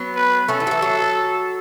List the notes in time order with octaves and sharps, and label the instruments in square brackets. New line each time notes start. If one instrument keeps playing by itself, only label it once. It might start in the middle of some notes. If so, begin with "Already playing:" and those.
Already playing: [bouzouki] F#3 B3
[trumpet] B4
[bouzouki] A3 C#4 [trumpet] A4
[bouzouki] E3
F#3
E3
F#3